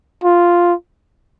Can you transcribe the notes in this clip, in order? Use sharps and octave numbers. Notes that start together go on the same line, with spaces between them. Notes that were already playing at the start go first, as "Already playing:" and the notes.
F4